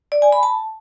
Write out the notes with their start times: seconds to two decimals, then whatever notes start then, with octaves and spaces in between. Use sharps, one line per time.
0.12 D5
0.22 G#5
0.32 B5
0.43 A5